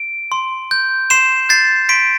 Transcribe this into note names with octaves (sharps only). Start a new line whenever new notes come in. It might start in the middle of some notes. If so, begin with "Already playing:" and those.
Already playing: D7
C6
G6
C6 C7 E7
G6 A6 C7
C6 B6 D7